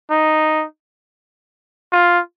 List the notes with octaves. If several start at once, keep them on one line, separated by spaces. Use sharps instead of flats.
D#4
F4